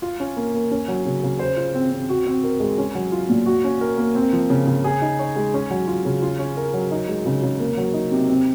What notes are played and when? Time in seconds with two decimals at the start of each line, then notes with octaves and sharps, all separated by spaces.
0.02 F4
0.20 C#4
0.37 A#3
0.54 A#3
0.71 C#4
0.88 F#3
1.06 C#3
1.23 C#3
1.39 C5
1.57 F4
1.74 C4
1.91 C4
2.09 F#4
2.26 C4
2.44 A#4
2.60 G#3
2.78 C#4
2.95 F#3
3.12 F4
3.29 A#2
3.46 F#4
3.64 C#4
3.81 A#4
3.98 A#3
4.15 C4
4.33 F3
4.50 C#3
4.67 C#3
4.84 G#4
5.02 D#4
5.19 C#5
5.36 G#3
5.54 C#4
5.70 F#3
5.87 F4
6.05 C#3
6.22 F4
6.39 C#4
6.57 A#4
6.74 F#3
6.91 D#4
7.08 G#3
7.26 C#3
7.43 C#3
7.59 A#3
7.77 F#3
7.94 D#4
8.11 C3
8.29 C4